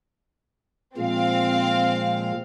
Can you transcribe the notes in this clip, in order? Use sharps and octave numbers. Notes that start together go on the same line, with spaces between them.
A#2 F3 G#3 C4 F5